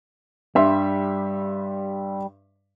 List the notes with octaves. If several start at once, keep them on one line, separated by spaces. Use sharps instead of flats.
G2 G3 E5 C6